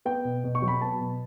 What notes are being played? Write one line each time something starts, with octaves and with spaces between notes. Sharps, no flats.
B3 G5
B2
B2
C#6
F#3
B5
B3 A5
B2